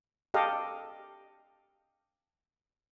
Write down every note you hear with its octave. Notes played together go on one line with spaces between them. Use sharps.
G4 A4 D#5 F5